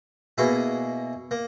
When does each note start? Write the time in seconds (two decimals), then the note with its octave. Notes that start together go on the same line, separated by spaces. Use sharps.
0.38 B2 A#3 E4 G#4
1.31 A#3